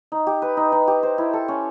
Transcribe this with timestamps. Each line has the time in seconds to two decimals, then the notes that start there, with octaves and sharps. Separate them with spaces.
0.12 D#4
0.27 G4
0.42 B4
0.57 D#4
0.72 D#4
0.88 G4
1.03 C5
1.18 E4
1.33 A4
1.48 C#4